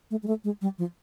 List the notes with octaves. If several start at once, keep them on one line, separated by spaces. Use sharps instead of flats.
A3
G#3
A3
G#3
G3
F3